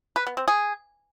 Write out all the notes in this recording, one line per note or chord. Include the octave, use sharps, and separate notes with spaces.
B4
B3
C4
G#4